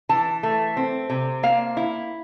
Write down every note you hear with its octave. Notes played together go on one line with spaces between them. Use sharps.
E3 A5
A3
C4
C3
A#3 F5
E4